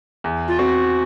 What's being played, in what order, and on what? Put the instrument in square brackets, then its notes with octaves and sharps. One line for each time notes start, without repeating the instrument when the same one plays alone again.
[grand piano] E2
[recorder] F4
[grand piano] C4 [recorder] F#4